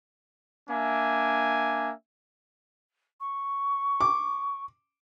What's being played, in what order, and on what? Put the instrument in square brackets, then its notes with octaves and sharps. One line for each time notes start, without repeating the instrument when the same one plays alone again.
[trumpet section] A#3 D4 E5 G#5
[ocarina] C#6
[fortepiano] D6